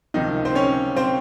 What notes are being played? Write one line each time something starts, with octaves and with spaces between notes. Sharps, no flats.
C#2 C3 D#3 F3 D#4
C4 C5
C#4 C#5
C4 C5